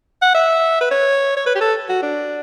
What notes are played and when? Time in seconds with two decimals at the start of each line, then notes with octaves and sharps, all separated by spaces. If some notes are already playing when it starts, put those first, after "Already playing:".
0.22 F#5
0.35 E5
0.81 B4
0.91 C#5
1.37 C#5
1.46 B4
1.55 G4
1.61 A4
1.89 F#4
2.03 D4